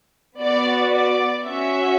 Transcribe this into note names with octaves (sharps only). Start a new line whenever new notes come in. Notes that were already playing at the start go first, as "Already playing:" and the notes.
B3 F#4 D5
D5
C#4 F#4 E5